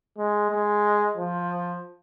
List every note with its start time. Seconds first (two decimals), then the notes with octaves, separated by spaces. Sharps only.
0.18 G#3
0.51 G#3
1.18 F3